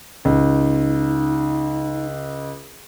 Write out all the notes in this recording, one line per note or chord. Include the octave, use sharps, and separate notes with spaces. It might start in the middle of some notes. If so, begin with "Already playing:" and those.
C#2 D#4